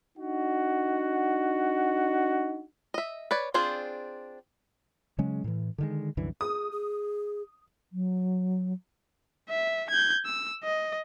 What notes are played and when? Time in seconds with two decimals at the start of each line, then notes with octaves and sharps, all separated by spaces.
0.18 D4 D#4 F#4 F#5
2.94 D#5 E5
3.31 B4 C#5 D5
3.54 C4 D4 F4 G#4 C5
5.18 C#3 F#3 G#3 C#4
5.44 A2 E3
5.78 D3 D#3 G#3
6.17 C2 F#2 D3 E3
6.41 G#4 D#6
6.72 G#4
7.92 F#3
9.49 E5
9.90 G6 G#6
10.25 E6
10.64 D#5